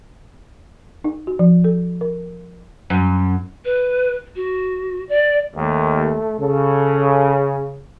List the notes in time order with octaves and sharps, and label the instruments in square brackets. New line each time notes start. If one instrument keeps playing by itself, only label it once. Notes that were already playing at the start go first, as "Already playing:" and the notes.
[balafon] D#4
F#4
F3
A4
A#4
[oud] F#2
[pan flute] B4
F#4
D5
[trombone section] D#2 [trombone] A3
[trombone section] C#3 [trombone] A4